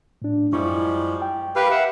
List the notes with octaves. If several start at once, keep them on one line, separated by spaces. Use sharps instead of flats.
A2 D4
F#2 F3 G3 G#3 E4 C#6
G5
G4 A#4 B4 F5
E5 F#5